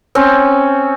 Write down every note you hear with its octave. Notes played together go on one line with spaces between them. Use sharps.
C4 C#4